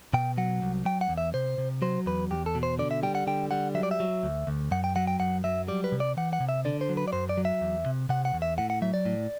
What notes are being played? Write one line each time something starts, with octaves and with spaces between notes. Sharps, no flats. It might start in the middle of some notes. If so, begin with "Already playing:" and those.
B2 G5
F#3 F#5
C2
F#3 G5
F#5
E2
E5
C3 C5
C3
F#3 C5
E2 B4
E2 G4
A4
B2
C5
D3 D5
E5
G3 G5
F#5
D3 G5
G3 F#5
F#3 E5
D5
E5
F#3
D2
D2
F#2 F#5
G5
F#3 F#5
G5
F#2 F#5
F#3 E5
G3 D5
B4
C3
D5
E3 F#5
F#5
C3
E5
D3 D5
C5
F#3
B4
D5
F#2 C5
D5
F#3
E5
E2
C3
C3 F#5
F#5
E2
E5
A2 F#5
F#5
F#3 E5
D5
A2